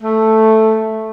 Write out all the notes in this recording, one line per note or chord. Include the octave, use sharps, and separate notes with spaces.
A3